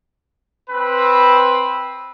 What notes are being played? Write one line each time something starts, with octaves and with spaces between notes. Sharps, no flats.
C4 B4